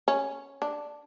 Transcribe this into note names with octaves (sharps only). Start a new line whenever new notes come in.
C#4
D4